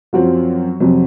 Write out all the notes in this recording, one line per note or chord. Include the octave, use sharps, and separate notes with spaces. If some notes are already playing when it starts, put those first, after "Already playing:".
F#2 F3 F#3 C4 F#4
F2 C3 F#3 C4